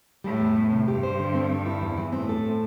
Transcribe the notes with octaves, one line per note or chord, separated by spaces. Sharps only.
A2 G3
E2
E2
C3
G2 G4
C5
D3
C4
C4
E4
E2
E3
A2 C4
A4